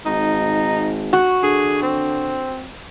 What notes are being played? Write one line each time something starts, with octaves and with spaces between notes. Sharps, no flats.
G#1 D#4
F#4
D3 G#4
C4